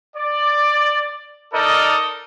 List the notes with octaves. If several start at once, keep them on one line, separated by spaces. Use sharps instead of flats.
D5
D#4 A4 A#4 D5 D#5